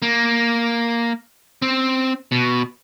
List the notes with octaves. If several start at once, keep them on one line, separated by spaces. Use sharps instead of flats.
A#3
C4
B2